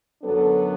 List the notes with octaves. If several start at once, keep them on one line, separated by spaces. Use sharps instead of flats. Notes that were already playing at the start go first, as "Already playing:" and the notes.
F#2 D3 F#3 B3 D4 A4